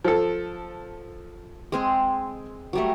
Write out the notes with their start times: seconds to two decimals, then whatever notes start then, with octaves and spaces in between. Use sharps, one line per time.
0.04 F3 A4
1.72 G#3 C4 G#4
2.73 F#3 G3 A3